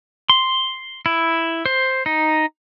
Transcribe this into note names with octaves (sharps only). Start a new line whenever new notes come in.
C6
E4
C5
D#4